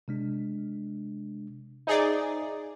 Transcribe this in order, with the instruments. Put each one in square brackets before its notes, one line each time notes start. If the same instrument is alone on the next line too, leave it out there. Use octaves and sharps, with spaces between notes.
[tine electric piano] C3 G#3 D4
[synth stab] D#4 G#4 D5 [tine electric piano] C5 E5